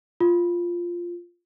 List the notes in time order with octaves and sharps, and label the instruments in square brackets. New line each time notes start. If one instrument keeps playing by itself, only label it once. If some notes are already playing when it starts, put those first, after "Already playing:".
[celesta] F4